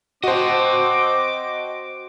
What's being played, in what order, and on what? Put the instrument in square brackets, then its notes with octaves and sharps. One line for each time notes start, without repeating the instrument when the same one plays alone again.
[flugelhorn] C4 [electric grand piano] F#4 C5 [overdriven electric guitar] D#5 A5 [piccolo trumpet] D6